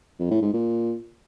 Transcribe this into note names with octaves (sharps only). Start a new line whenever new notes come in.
F2
A2
G#2
A#2